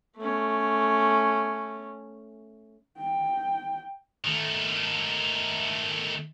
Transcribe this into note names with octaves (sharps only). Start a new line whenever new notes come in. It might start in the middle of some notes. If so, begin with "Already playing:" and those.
A3 C#4
G5
D#3 A3